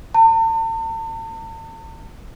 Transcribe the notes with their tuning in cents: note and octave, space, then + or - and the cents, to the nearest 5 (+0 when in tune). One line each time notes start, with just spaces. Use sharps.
A5 +45